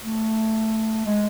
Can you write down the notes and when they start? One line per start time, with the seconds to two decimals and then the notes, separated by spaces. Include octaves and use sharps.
0.02 A3
1.06 G#3